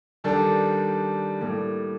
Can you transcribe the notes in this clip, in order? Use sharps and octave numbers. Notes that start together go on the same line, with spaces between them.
D#3 G3 D4 A4
A2 G3 A#3